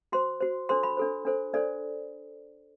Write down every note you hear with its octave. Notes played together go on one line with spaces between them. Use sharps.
F#4 C5 C6
F#4 C5
D4 A4 C5 C6
B5
D4 A4 C5
D4 A4 C5
D4 A4 C5 D5